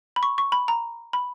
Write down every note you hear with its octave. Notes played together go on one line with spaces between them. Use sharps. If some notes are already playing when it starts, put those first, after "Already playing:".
B5
C#6
C#6
B5
A#5
B5